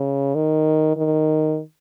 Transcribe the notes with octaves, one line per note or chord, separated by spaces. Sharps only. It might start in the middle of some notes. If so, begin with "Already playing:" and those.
Already playing: C#3
D#3
D#3